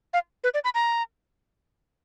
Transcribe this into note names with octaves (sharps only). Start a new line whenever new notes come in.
F5
B4
D5
B5
A#5